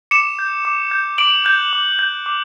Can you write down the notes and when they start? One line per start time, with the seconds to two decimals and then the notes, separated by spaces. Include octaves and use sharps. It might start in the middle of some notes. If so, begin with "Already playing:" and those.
0.11 D6 C#7 E7
0.39 G6
0.65 D6
0.91 G6
1.18 D6 D7 F#7
1.45 F#6 G6
1.73 D6
1.99 G6
2.26 D6